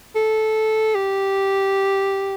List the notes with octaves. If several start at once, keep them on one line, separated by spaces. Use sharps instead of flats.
A4
G4